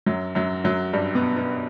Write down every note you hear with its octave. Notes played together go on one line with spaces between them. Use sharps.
F#2 F#3
F#2 F#3
F#2 F#3
G2 G3
B2 B3
B2 B3